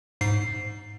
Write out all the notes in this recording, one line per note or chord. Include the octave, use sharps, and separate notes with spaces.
G#2 C7